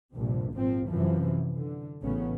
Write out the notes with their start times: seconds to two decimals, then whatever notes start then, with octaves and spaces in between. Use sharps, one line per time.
0.15 A#1 G2 C3
0.54 G#1 A#2 F3 C4
0.89 F#2 C3 E3 F3
1.55 D3
2.02 A1 A2 C#3 B3 C#4